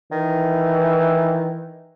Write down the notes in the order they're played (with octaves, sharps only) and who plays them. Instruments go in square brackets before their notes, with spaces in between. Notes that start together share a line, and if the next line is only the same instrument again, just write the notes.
[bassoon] D#3 [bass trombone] E3